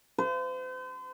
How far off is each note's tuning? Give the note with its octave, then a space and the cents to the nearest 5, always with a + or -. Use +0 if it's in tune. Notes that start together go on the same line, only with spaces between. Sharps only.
C5 -40